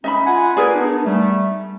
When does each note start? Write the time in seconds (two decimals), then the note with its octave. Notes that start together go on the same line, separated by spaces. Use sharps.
0.04 C#4 D#4 D#5 E5 B5
0.26 F4 F#5 G#5
0.57 G#4 A#4 B4 D5 G#5
0.75 B3 D4 D#4
1.05 G3 A3